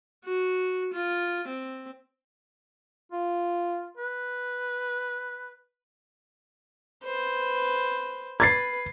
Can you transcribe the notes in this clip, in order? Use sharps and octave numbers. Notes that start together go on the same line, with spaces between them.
F#4
F4
C4
F4
B4
B4 C5
B4 G#6 A6 C7